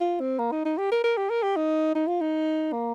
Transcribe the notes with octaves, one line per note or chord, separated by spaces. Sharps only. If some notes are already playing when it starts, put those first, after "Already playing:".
F4
C4
A#3
D#4
D#4
G4
A#4
A#4
G4
A#4
G4
D#4
D#4
F4
D#4
A#3